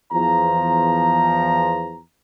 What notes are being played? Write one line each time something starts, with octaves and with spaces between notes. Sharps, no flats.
E2 F3 A#5